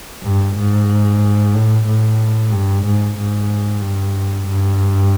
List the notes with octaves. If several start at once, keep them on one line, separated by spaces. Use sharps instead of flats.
G2
G#2
A2
A2
G2
G#2
G#2
G2
G2